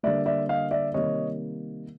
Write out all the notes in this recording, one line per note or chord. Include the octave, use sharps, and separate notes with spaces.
D3 G3 A#3 D5 E5
D5 E5
D#5 F5
D5 E5
C3 D#3 G3 A#3 C#5 D#5